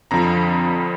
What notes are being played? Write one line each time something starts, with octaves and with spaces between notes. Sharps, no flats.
F2 D3 F3 A#5